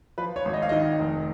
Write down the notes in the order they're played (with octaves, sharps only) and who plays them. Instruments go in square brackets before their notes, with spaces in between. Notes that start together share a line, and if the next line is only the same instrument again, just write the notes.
[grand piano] F3 B4
C#5
G#1
D#5
F5
D#3 D#5
F1